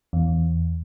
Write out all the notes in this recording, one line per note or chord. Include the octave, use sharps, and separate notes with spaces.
E2